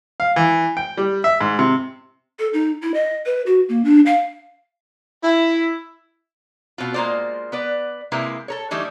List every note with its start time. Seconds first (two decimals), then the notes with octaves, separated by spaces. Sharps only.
0.20 F5
0.36 E3
0.77 G5
0.97 G3
1.24 E5
1.41 G#2
1.59 C3
2.39 A4
2.53 D#4
2.82 E4
2.94 D#5
3.26 B4
3.46 F#4
3.69 A#3
3.85 D4
4.06 F5
5.23 E4
6.78 B2 C4 F4
6.94 G#3 A#3 C4 F4 C5 D5
7.52 B3 B4 D5
8.12 C3 G#3 A#3 E4 B4
8.48 A4 A#4 C#5
8.71 D3 E3 G3 A3 D#4